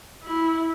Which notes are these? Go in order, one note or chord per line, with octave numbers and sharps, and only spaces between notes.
E4